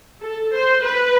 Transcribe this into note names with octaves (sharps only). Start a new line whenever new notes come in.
A4
C5
B4